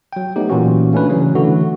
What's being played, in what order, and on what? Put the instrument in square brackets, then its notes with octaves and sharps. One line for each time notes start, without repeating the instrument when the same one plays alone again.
[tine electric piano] F#3 G5
F#3 A3 B3 D#4 G4
A#2 E3 A#3 C#4 F#4
A3 C#4 D4 B4
C#3 E3 F#3 C#4
D3 E3 A3 F#4